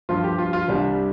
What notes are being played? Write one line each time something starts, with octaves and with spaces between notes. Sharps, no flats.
G2 F3 F4
G4
F4
F4
C2 C3 G3 D4